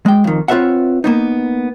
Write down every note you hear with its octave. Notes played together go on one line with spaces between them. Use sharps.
G#3 G5
F2 D#3
C4 F4 B4 C#5 E5 F#5
A#3 B3 D#4